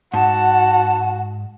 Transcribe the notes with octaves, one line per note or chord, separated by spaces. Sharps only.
G#2 F#4 F#5 A5